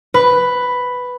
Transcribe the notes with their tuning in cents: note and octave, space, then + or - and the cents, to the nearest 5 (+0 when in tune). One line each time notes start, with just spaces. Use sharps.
B4 +5